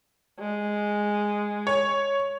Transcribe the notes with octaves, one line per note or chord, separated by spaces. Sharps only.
G#3
C#5